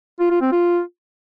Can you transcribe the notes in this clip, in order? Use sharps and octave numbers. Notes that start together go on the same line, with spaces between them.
F4
F4
C4
F4